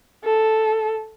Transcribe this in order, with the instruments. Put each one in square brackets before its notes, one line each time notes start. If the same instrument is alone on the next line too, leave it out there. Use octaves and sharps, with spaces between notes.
[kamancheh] A4